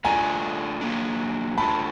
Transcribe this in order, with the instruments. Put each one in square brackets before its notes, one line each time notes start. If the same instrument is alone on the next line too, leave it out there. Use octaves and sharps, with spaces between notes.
[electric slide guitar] A3 D4 F4 A4 D5 [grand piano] G#5 A#5
[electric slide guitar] F#3 A#3 D4
[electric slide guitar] A3 D4 F4 A4 C5 [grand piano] A5 B5